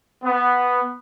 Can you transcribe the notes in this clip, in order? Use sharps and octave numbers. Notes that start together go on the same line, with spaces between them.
B3